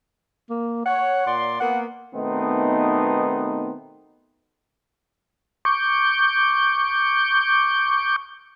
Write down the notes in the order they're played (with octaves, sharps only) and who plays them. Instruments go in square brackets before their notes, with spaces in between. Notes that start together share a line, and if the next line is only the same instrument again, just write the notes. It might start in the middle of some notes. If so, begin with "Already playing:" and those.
[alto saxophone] A#3
[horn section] C#5 [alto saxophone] F#5
[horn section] A#2 D5 C6
[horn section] A#3 B3 [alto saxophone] F#5
[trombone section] B2 D#3 A3 B3 C4 D#4
[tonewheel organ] C#6 D6 G6